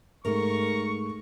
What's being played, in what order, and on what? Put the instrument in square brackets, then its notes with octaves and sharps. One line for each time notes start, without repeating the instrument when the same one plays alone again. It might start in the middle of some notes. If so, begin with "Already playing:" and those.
[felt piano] G#2 A3 [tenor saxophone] A#4 [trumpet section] C#6